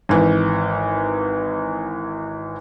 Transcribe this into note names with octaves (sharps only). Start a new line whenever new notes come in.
G#1 E3